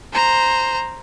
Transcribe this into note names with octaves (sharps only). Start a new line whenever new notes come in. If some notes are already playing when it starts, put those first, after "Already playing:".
C5 A#5